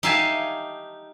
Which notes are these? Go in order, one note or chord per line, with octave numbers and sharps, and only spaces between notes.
D#4 G4 E5 F5 G#5 A5